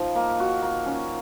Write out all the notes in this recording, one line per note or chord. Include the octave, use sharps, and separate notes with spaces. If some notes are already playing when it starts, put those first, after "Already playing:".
Already playing: F3 D#4
A#3
F#4
A#3
C#4